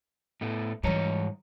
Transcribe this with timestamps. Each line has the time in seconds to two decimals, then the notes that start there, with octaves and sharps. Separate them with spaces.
0.41 A2 A3 B3
0.83 G#2 E3 G3 C#5 A#5